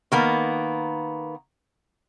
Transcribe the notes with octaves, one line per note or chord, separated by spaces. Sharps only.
D#3 A#3 B3